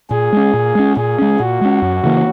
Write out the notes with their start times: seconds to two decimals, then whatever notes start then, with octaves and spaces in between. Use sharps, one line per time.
0.11 A#2 G#4
0.33 G#3 C#4
0.54 A#2
0.75 G#3 C#4
0.97 A#2 G#4
1.18 G#3 C#4
1.40 A#2 F#4
1.61 G#3 C#4
1.82 F#2
2.04 C#3 E3 A#3